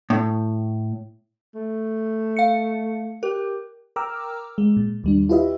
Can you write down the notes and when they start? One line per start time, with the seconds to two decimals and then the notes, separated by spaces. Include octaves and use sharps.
0.10 A2
1.55 A3
2.37 F5 C#7
3.23 G4 A#4
3.96 A#4 G5 A#5 D6 E6 F6
4.58 G#3
4.77 A#2
5.04 D#2 G3 D4
5.29 E4 F4 G4 B4 D#5 E5